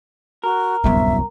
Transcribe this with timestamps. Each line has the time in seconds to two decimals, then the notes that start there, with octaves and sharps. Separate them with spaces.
0.44 F#4 A#4
0.84 D1 C2 F#2 G3 B3 E5